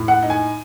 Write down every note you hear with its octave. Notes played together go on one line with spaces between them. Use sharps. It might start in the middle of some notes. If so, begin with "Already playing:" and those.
Already playing: A2
F#5
D#4
G#5